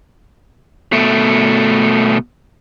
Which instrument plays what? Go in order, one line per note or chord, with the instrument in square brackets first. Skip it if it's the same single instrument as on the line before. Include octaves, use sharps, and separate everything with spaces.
[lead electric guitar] B2 A3